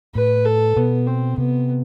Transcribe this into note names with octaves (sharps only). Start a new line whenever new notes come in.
A2 B4
A4
B2 B3
C4
C3 B3